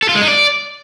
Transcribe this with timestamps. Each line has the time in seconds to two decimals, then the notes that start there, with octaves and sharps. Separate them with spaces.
0.03 A4
0.09 F4
0.15 G#3
0.22 D#4
0.28 D5